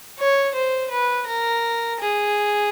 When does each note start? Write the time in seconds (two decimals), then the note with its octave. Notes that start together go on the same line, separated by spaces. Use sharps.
0.19 C#5
0.54 C5
0.90 B4
1.27 A#4
2.00 G#4